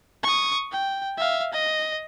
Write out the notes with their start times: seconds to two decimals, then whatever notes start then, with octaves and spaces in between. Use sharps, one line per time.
0.23 C#6 D#6
0.72 G5
1.17 E5 F5
1.53 D#5